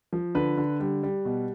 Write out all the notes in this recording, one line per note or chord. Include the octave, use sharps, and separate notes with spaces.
F3
D3 B4
D3
G3
G3
B2